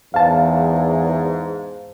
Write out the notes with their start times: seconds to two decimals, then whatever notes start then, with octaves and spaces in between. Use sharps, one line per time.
0.14 E2 G#2 F5 A5